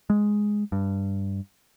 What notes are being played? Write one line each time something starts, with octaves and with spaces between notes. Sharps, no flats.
G#3
G2